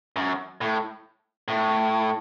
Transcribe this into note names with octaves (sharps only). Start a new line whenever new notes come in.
F#2
A2
A2